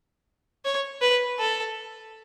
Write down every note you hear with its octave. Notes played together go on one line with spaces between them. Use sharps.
C#5
B4
A4